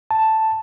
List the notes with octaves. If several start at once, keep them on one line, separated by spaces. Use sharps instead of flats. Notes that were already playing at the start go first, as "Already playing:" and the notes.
A5